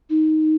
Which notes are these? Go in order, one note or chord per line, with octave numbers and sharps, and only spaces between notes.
D#4